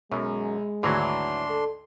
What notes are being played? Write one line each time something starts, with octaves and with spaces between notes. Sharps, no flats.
B1 F#2 G#3
G#1 D2 E3 F#3 D4 F#4 C6
A4